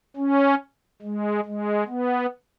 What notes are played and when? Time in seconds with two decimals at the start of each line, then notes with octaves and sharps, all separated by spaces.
0.17 C#4
1.02 G#3
1.46 G#3
1.88 B3